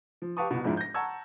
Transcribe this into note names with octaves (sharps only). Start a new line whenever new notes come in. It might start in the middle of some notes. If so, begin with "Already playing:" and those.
F3
G4 B4 F5 A5 C#6 D#6
C2 B2
F2 G#2 G#3 D4 E4 F4
G6 A#6
F#5 A5 A#5 C#6 E6 G#6